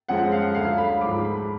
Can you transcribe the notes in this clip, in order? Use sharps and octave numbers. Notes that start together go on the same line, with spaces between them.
F#2 F3 G#3 F#5
F5
D2 D3 F#3 F5
B5
G#2 F3 G#3 D6
B5